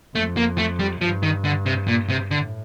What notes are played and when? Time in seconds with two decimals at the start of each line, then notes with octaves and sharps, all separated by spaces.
0.15 F2 A3
0.37 A#3
0.58 A3
0.79 G3
1.01 G2 F3
1.23 D#3
1.45 D3
1.66 C3
1.88 A#2
2.09 C3
2.31 A2 D3